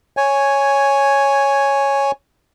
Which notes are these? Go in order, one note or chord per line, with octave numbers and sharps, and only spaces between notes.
C#5 G#5